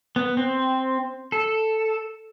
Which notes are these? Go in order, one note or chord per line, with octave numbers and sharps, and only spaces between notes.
B3
C4
A4